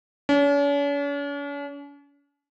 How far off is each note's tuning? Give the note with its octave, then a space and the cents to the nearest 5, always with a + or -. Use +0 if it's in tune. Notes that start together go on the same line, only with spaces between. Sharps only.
C#4 +45